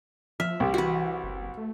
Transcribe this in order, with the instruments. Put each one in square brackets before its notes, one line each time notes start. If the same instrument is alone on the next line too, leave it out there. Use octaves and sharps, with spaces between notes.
[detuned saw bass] F3 [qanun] E5 [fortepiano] F6
[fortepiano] C2 G4
[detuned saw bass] E3 [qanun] F#4 B4
[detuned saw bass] F#1
A3